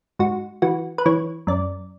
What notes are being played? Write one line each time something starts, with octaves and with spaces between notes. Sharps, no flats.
G#2 F#4
E3 F#4
B4
E3 C#5
F#2 D5